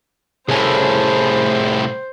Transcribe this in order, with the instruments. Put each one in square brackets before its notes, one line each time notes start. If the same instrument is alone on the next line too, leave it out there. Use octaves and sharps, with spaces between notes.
[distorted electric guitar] C2 A2 [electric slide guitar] G#4 C#5 G#5 [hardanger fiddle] C5